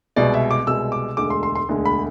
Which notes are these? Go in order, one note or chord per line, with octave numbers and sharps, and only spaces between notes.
C2 B2 G#3 D5
E5
D6
C2 B2 G#3 E6
D6
E1 D2 D3 G#3 D6
C6
C6
C6
E1 D2 D3 G#3
B5